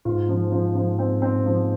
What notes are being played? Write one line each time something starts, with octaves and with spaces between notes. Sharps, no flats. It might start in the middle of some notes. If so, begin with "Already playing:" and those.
G#2 F4
F3
F3
F3
C4
C4
F3